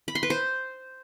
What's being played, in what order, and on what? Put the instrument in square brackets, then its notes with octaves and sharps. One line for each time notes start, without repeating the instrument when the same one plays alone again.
[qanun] B5
C6
B4
C5